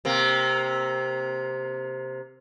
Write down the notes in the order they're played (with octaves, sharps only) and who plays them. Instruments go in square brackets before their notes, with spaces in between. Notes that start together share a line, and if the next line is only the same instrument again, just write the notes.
[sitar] C3 A#3